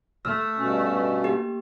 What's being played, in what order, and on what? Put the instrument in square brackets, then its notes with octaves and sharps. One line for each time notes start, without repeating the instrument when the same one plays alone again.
[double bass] A3 [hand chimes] E6 F6
[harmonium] G2 B2 C#4
[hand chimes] A#3 G4